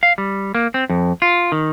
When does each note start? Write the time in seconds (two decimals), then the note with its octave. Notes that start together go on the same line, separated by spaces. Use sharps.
0.03 F5
0.18 G3
0.55 A#3
0.74 C4
0.90 F2
1.22 F4
1.52 D#3